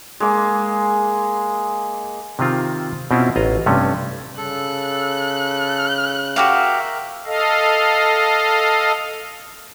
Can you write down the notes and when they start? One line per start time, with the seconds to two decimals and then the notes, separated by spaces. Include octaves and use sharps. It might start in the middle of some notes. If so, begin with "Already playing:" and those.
0.20 G#3 A#3 D6
2.39 C3 D#3 C4 F4
3.11 B2 C4 C#4 E4 F4
3.36 A1 F4 D#5 A#5
3.66 G2 C3 A3 C#4
4.37 C#3 A4 F#6
6.36 F#4 G4 A#4 E5 F5
7.26 A4 D#5 F5